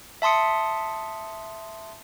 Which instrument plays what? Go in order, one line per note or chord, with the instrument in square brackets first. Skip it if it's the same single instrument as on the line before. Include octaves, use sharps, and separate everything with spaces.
[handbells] E5 A5 C6 D#6 C#7